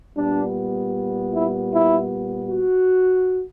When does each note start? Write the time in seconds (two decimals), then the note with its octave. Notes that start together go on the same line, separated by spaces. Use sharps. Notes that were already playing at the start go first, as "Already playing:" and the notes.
0.17 A#2 G3 B3 D4
1.33 E4
1.72 E4
2.49 F#4